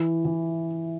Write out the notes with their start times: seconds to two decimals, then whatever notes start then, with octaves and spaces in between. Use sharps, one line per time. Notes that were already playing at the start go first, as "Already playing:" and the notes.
Already playing: E3
0.25 E3